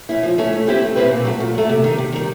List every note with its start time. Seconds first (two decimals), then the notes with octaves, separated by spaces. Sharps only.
0.09 A3 C#4 E4
0.23 F3
0.38 A3 C#4 E4
0.52 A3
0.67 C4 E4 G4 B4
0.82 A3
0.96 C4 E4 G4 B4
1.11 A#2
1.25 F#3 A3
1.40 A#2
1.54 F#3 A3
1.69 C3
1.84 D#3 G3
1.98 C3
2.12 D#3 G3